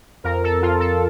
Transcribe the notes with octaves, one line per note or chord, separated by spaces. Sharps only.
F2 A#4
A4
F2 F4
A4